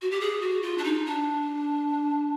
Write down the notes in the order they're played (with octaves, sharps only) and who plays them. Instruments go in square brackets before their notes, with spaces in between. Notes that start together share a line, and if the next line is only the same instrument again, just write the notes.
[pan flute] F#4
G4
G#4
F#4
F4
D4
D#4
D4